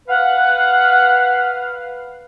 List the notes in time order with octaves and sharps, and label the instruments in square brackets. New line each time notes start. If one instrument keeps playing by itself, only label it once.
[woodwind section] B4 F5 [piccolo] F#5